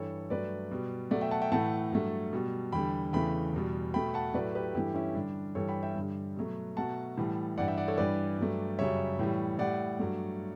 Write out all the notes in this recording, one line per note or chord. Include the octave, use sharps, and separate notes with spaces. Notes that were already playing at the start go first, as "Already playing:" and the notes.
Already playing: G2 E3 G3 A4 C#5
G2 F#3 A3 B4 D5
B2 G3
B2 F#3 A3 D5 F#5
E5 G5
F#5 A5
E5 G5
A2 E3 A3 F#5 A5
G2 F#3 A3
B2 G3
E2 D3 G3 G5 B5
E2 C#3 E3 A3 G5 B5
E2 B2 G3
B2 A3 G5 B5
F#5 A5
A2 F#3 A3 B4 D5
G4 B4
G2 E3 A3 E4 G4
C#4 E4
G2 D3 G3 D4
G2 E3 G3 A4 C#5
G5 B5
E5 G5
G2 D3 G3
B2 F#3 A3
B2 F#3 A3 F#5 A5
A2 E3 G3
G2 E3 G3 D5 F#5
E5 G5
D5 F#5
A4 C#5
G2 E3 G3 B4 D5
G2 F#3 A3
F#2 C#3 G3 C#5 E5
A2 E3 G3
A2 G3 D5 F#5
G2 F#3 A3